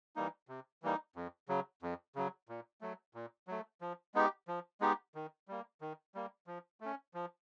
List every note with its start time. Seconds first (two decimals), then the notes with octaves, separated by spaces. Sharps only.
0.16 E3 G3 A#3 D#4
0.48 C3
0.83 E3 G3 A#3 D#4
1.16 F2
1.48 C#3 F#3
1.82 F2
2.15 C#3 F#3
2.49 A#2
2.81 F#3 A3
3.14 A#2
3.47 F#3 A3
3.81 F3
4.14 G#3 B3 D#4 G4
4.48 F3
4.81 G#3 B3 D#4 G4
5.15 D#3
5.48 G3 A#3
5.81 D#3
6.15 G3 A#3
6.47 F3
6.81 A3 C#4
7.14 F3